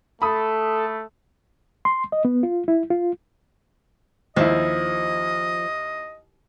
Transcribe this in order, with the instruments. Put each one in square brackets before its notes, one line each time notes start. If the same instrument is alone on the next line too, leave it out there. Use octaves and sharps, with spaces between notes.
[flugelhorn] A3 [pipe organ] A4 [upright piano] B5 D#6
[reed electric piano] C6
D#5
B3
F4
E4
F4
[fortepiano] D#2 E4 [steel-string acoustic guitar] F3 [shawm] D#5